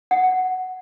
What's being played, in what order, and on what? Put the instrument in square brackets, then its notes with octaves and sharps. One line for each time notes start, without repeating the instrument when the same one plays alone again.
[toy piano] F#5